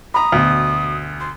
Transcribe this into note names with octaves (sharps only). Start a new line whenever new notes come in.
A#5 B5 D#6
D2 B2
C6